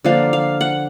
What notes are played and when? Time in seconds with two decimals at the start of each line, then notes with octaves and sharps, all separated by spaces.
0.05 D3 F3 A#3 D4 F5
0.33 F5
0.61 F#5